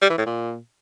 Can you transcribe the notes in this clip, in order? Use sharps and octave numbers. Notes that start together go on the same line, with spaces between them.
G3
E3
A2
A#2